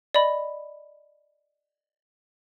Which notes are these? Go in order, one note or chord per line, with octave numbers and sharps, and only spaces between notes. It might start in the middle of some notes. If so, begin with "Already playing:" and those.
D5 D#5 B5